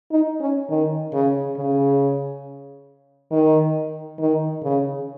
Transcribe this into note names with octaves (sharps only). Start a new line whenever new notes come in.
D#4
C#4
D#3
C#3
C#3
D#3
D#3
C#3